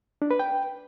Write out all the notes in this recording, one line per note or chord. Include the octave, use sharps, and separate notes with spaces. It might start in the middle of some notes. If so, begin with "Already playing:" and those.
D4
B4
G5